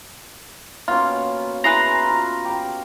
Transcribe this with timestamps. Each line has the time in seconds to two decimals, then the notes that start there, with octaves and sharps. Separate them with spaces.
0.88 B2 A#3 C#4 F4
1.64 E4 G#4 B4 A#5 C6
2.03 F4
2.45 G4 B5